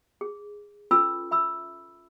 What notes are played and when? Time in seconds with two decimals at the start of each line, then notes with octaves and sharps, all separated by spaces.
0.21 G#4
0.91 C#4 F4 A4 B4 B5 E6
1.31 E5 B5 E6